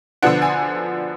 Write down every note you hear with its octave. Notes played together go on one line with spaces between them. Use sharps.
D3 F3 B3 D4 F#5
G#5